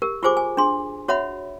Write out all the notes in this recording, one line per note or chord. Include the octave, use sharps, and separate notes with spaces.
G4 A#4
F4 G4 G#4 C5 G#5 D6
G#5
D4 G#4 C6
F#4 C#5 E5 F#5 B5